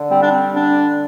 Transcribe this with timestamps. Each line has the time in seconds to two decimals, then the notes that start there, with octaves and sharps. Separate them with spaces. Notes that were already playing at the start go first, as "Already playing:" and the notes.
Already playing: D3
0.10 G3 C4
0.21 D4
0.31 C4
0.54 D3 D4